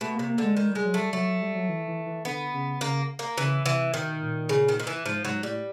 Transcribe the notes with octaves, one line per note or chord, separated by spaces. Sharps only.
B2 A3
C3 A#3
A#3
D3 G#3
D#3 G#3
G3
G#3
F#3
G3 A3
F#3 A3
F#3
G3
F#3
E3
E3
E3
D3 B3
C#3
C#3 A#3
A#3
C#3 E3
C3 E3
B2 D#3
A#2
C#3
D#3
D#3
E3
G#2 F3
G#2 F#3
A2 G3